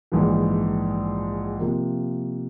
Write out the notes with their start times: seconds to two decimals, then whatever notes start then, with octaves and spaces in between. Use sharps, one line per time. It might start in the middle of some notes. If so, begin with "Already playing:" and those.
0.12 A#1 G#2 E3
1.59 C3 F3 A#3